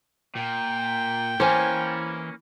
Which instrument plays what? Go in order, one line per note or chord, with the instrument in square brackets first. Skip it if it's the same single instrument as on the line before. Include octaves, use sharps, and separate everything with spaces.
[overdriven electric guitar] A#2 [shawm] G5
[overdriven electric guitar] E3 [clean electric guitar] A#3 C#4 [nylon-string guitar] C5 G#5